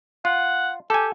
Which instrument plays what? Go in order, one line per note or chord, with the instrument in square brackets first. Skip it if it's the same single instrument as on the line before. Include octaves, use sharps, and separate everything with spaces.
[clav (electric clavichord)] F4 [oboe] F#5
[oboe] G4 [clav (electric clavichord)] A4 G#5